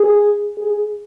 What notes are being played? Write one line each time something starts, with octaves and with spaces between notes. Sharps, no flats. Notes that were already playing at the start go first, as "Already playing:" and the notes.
Already playing: G#4
G#4